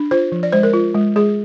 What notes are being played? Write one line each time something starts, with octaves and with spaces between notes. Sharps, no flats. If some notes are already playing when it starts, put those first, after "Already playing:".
Already playing: D4
F4 C5
F3
D5
G#3 C5
A#4
F4
G#3
G#3 G#4